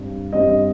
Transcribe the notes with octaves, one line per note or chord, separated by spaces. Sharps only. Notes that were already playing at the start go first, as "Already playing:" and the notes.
Already playing: G2 G3 C4
G2 G3 C4 D#5